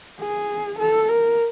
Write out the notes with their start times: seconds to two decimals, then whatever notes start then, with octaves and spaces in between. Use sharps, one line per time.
0.21 G#4
0.79 A4
1.08 A#4